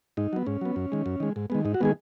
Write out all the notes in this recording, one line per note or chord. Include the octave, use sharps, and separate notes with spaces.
G#2 D#4
F#3 B3
G#2 C#4
F#3 B3
F#2
D#3 G#3
F#2
D#3 G#3
G#2
D#3 G#3 B3
G#2 D#4
F#4
D#3 G#3 B3 G#4